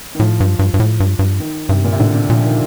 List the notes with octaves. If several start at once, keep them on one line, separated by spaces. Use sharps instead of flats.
D#3
A2 F3
G2
G2
G2
A2
G2
G2
D#3
G2 C3
A#2
C3
A2 D3
D3
A#2 F3
D#3